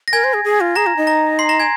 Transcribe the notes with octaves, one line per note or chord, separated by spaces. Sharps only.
A#6
A#4 G#5 G#6
C5
G#4
G#4
F4
G#4 A#5 A#6
F4
D#4
A#5 A#6
C6 C7
A#5 A#6
G#5 G#6